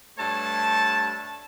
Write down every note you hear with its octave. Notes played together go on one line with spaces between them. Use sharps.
G2 A3 C#5 A5